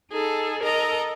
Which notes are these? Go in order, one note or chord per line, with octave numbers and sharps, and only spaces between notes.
D#4 G#4 A4
A4 A#4 D#5 A#5